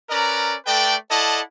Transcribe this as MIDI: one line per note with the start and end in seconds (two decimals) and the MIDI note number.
0.10 0.55 61
0.10 0.55 70
0.10 0.55 71
0.10 0.55 74
0.10 0.55 82
0.66 0.95 57
0.66 0.95 69
0.66 0.95 71
0.66 0.95 74
0.66 0.95 79
1.10 1.40 64
1.10 1.40 69
1.10 1.40 74
1.10 1.40 75
1.10 1.40 78
1.10 1.40 81